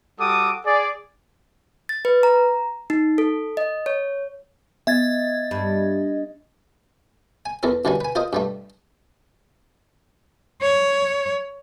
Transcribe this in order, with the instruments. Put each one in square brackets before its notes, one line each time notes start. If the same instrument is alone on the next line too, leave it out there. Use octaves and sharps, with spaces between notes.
[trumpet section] G3 F#4 A4 D6 D#6
G#4 D5
[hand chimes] A6
B4
A#5
D#4
A4
D#5
C#5
[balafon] B3 [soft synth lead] D#5 [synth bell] E5 G#6 A6
[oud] G2
[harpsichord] G#5
E2 E3 A4 A#4
F#2 D3 E3 G3 C#4
B4 G#5
F4 A#4 C5 D#5
G2 G3 A3
[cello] C#5